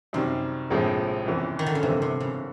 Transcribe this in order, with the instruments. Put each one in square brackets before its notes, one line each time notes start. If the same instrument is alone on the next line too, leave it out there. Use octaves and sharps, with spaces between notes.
[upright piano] F#2 D#3 G3 [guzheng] C3
[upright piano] A#1 A2 F3 G#3 C4
G1 F2 C#3 E3
[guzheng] D#3
D3
C#3
[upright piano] G#1 G2 E3 G3 B3 [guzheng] C3
[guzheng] C3
C#3